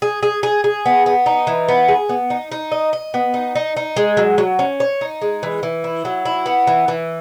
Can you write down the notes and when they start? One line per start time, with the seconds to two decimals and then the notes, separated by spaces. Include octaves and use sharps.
0.02 G#4
0.23 G#4
0.43 G#4
0.64 G#4
0.86 B3
1.06 B3
1.26 D#4
1.47 E3
1.68 B3
1.88 G#4
2.09 B3
2.30 D#4
2.52 D#4
2.72 D#5
2.93 D#5
3.14 B3
3.34 D#4
3.55 D#4
3.77 D#4
3.97 G#3
4.17 F#3
4.38 F#3
4.59 C#4
4.80 C#5
5.01 D#4
5.21 G#3
5.43 E3
5.63 E3
5.84 E4
6.05 F#3
6.25 E4
6.46 B3
6.67 E3
6.88 E3